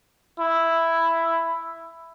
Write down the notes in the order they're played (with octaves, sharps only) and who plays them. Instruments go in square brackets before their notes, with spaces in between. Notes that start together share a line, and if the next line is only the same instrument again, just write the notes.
[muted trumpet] E4